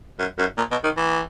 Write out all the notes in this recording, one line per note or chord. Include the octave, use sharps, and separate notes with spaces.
F#2
F#2
A#2
B2
D#3
E3